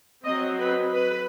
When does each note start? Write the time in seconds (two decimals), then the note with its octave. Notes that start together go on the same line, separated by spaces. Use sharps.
0.25 F#3 C4 D#5
0.59 B4
0.93 B4